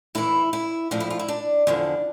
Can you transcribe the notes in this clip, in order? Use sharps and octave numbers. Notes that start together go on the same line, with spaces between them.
A2 E3 E4
E4
A2 F3 D4
E4
F4
E4
D4
E2 D3 F3 D4